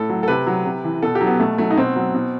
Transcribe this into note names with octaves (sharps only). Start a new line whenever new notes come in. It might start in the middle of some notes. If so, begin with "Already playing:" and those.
Already playing: A2 A4
F#3
A4
C3 B4
F#3
C3
E3
B2 A4
G4
F#3
B3
B2 A3
F#3 A3
D#4
B2 C4
F#3
B2